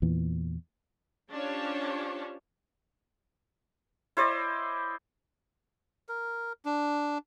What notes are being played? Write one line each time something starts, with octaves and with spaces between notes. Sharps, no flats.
E2 A#2 E3
C#4 D4 F4 G4 C5 C#5
E4 C5 D5 D#5
A#4
D4